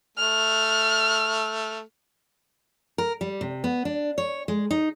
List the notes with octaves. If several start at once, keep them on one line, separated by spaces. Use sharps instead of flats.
A3 F6
A#4
G3
C3
B3
D4
C#5
G#3
D#4